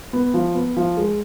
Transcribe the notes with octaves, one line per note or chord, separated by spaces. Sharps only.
B3
F3
B3
F3
G#3